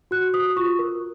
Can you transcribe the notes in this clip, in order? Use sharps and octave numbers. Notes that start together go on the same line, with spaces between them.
F#4 F#6
F#4 D#6
F4 C#6
A#4